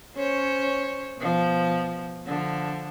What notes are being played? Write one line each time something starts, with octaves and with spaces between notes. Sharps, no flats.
C#4 C5 C#5
B2 F3
D3 F3